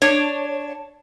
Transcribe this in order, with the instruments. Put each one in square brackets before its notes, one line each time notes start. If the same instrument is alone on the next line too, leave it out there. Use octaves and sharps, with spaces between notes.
[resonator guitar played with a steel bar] D4 C#5